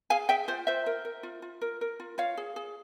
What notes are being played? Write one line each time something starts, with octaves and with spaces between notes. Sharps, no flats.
G#4 F5 G#5
G#4 E5 G5
F4 C5
F4 C5 E5
A#4
A#4
F4
F4
A#4
A#4
F4
F4 C#5 F5
G#4
G#4